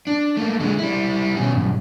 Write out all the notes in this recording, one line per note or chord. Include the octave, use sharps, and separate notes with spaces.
D4
A3 A#3
D3 G#3
G3 E4
B2 C#4
B1 G2